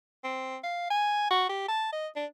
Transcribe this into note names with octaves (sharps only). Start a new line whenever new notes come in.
C4
F5
G#5
F#4
G4
A5
D#5
D4